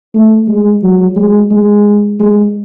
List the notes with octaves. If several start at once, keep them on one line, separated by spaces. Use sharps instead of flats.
A3
G#3
F#3
G#3
G#3
G#3